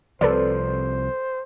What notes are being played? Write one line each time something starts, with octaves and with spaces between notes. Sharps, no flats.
C2 C3 F3 A4 B4 C5 D5